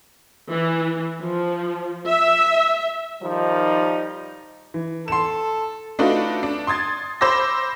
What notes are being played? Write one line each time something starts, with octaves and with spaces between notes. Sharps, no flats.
E3
F3
E5
D#3 F3 G3 D#4
E3
A4 C6 E7
A3 D4 D#4 F4 F#4 B4
D4
C6 D#6 G#6 A6
C5 B5 D6 E6 A#6